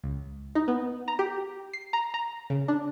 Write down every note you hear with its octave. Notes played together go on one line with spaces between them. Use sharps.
C#2
D#4
B3
A#5
G4
C7
A#5
A#5
C#3
D4